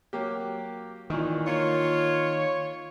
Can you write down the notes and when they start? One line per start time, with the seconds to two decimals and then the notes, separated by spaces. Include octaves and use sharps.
0.13 F#3 A#3 G4
1.10 A#2 D#3 E3 C#6
1.47 A#3 F4 C#5